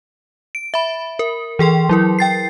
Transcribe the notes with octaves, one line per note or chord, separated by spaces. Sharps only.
D7
E5 B5
A#4
E3 G#4 G5 C6
F#3 E4 A#4
G5 A6 C7